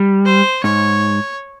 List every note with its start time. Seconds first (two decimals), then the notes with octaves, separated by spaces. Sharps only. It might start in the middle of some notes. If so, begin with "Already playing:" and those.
Already playing: G3
0.25 C5
0.64 G#2 C#5